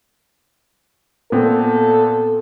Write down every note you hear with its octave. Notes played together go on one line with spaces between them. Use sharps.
A#2 B3 C4 A4